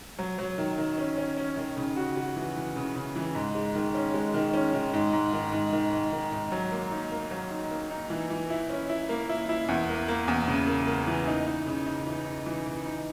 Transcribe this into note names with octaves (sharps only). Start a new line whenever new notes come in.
F#3
F#3
D#3
D#3
C#4
C#4
C#4
D#3
C#3
F#4
F#4
E3
E3
C#3
C#3
E3
G#2
G#3
D#3
C#4
G#3
D#3
C#4
D#3
G#2
G#2
D#3
G#2
D#3
G#2
D#3
G#2
F#3
A#3
D#4
A#3
F#3
D#4
A#3
D#4
E3
E3
E4
C#4
E4
A#3
E4
E4
E2
A#3
A#3
E2
C#3
A#3
A#3
E3
D#4
D#4
C#3
D#4
E3
D#4
E3
E3
D#4